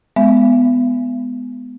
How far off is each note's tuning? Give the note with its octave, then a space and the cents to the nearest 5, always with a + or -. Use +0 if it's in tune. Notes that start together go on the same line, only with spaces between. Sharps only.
G#3 +5 B3 +10 E5 +40